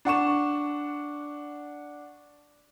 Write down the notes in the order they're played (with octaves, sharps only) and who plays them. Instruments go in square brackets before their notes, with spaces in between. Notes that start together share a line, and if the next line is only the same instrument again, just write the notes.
[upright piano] D4 F#5 C#6 E7